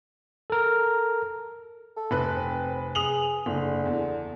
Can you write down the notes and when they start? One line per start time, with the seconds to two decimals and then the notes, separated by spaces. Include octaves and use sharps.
0.50 A4 A#4
1.96 A4
2.11 F1 B4 F#6
2.36 C4
2.95 G#4 D#6 F7 F#7
3.46 F#1 D3
3.86 E2